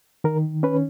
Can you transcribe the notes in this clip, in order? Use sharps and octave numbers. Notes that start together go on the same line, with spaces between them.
D#3 A#4
C#4 B4